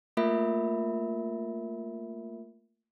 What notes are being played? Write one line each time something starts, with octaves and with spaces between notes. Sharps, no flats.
A3 A#3 F4 A#4 E5 B5